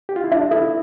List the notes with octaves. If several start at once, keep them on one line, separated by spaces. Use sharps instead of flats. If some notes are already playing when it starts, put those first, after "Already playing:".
G4
F4
E4
D4 E5
E4 A4